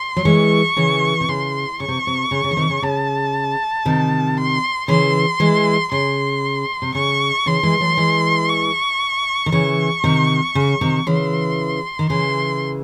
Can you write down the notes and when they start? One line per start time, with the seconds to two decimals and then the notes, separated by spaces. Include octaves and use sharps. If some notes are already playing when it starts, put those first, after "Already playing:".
Already playing: C6
0.16 F#3
0.25 E3 G#3 C#6
0.76 C#3 E3
1.20 C3
1.28 C#3 C6
1.80 C#3 C#6
1.88 C3
2.07 C3
2.31 C#3
2.44 C#3
2.51 E3
2.57 C3 D#3
2.70 C#3
2.82 C#3 A5
3.85 C3 D#3
4.37 C6
4.88 C#3 E3 C6
5.40 E3 G#3
5.92 C#3 C6
6.82 C3
6.95 C#3 C#6
7.46 C#3 E3 C6
7.63 E3 G#3
7.80 F#3 A3
7.97 E3 G#3
8.49 C#6
9.46 D#3
9.52 C#3 E3 C#6
10.04 C3 D#3
10.55 C#3
10.81 C3 D#3
11.06 C#3 E3 C6
11.99 D#3
12.10 C#3 E3 C6